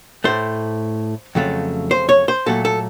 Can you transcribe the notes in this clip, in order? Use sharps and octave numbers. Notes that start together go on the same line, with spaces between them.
A2 A3 C5
F2 C#3 F#3 A3
C5
C#5
C5
A#2 F#3 A3 A4
A4